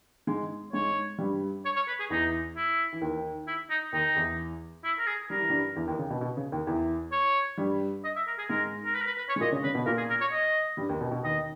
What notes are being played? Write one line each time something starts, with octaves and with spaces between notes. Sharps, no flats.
G#2 G#3
G#2 G#3 C#5
G2 G3
C#5
C#5
B4
G#4
E2 E3 D#4
E4
E3
D#2 D#3
E4
D#4
D#2 D#3 D#4
E2 E3
E4
A#4
G#4
G3 A#4
E3
G2 G3
E2 E3
D#2 D#3
C#3
B2
B2
C#3
D#2 D#3
E2 E3
C#5
G2 G3
D#5
E5
A#4
G#4
G#2 G#3 A#4
A#4
B4
A#4
B4
B4
C#5
G#3
A#2 A#3 D#5
C#3 C#4
C#3 C#4 B4
B2 B3
A#2 A#3 A#4
G#4
A#4
C#5
D#5
G2 G3
D#2 D#3
B2
B2
D#2 D#3 D#5